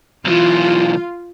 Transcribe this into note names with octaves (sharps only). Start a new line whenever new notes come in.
B1 E3 F4